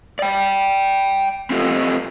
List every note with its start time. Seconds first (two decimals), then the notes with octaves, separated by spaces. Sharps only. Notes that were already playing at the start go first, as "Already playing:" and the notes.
0.19 D5 G5
1.50 C4 D4 F4 G4 A4 D#5